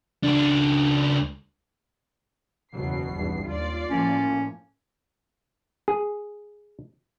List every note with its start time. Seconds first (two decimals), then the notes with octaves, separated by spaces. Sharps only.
0.23 C#2 D4
2.73 F#1 E2 B2 F#3 C7
3.11 G#1 E2 G2
3.45 D#2 F4 D5
3.90 A2 F3 A#3 C#4
5.88 G#4